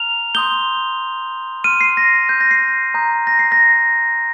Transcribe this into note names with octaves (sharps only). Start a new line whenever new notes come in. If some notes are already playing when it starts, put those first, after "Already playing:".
Already playing: A#5 F6 F7
C6 D#6 G6 G7
C6 F6 D#7
C7
A#6
G6
A#6
C7
A#5 D#6 G6
A#6
C7
A#6